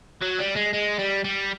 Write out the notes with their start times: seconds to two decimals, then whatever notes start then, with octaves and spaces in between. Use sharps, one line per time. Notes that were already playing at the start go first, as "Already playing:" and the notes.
0.21 F#3
0.39 G3
0.56 G#3
0.73 G#3
0.99 G3
1.24 G3